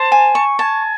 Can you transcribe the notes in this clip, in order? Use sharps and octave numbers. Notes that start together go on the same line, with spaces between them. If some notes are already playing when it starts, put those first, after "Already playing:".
Already playing: C5 A5
G#5
C#6
G#5 A5